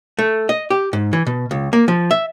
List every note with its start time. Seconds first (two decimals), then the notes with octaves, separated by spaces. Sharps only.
0.19 A3
0.49 D#5
0.70 G4
0.93 G#2
1.13 E3
1.26 B2
1.51 C#2
1.73 A#3
1.88 F3
2.11 E5